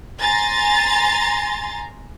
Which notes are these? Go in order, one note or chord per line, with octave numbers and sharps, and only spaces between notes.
G#5 A#5 C6 A6